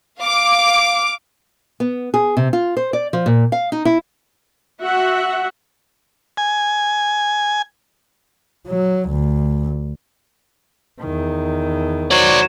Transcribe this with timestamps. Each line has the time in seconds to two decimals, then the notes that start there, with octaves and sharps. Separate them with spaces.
0.20 F5 D6
1.80 B3
2.14 G#4
2.37 C3
2.53 F4
2.77 C5
2.93 D5
3.13 F3
3.26 A#2
3.52 F5
3.72 D#4
3.85 E4
4.81 F#4 E5 F#5
6.37 G#5
8.67 F#3
9.09 D2
11.00 E2 D#3
12.11 F#3 C5 D5